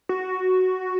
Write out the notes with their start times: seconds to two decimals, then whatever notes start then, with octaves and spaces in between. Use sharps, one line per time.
0.09 F#4